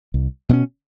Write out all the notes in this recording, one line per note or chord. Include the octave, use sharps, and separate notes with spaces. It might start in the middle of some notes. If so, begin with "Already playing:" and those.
C2
B2 G#3 C#4